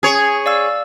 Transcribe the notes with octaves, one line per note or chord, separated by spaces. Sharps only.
G#4 C#5
D5 F5 E6